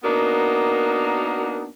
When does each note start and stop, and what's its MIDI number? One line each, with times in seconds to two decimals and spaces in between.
0.04 1.68 58
0.04 1.68 59
0.04 1.68 62
0.04 1.68 63
0.04 1.68 66
0.04 1.68 70